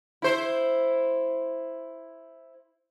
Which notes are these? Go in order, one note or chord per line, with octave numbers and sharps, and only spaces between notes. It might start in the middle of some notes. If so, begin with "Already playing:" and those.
E4 C5